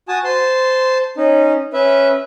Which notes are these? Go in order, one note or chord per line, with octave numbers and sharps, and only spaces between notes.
F#4 G#5 A5 D#6
C5 A5 C6
C#4 D#4
C#4 B4 E5